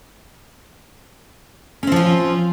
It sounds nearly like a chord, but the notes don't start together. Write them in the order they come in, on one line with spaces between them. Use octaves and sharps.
C#4 C4 F3 F4